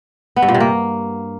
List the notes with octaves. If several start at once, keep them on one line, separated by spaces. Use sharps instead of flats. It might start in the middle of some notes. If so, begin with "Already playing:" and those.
B3
G2
A#2
C3
A#3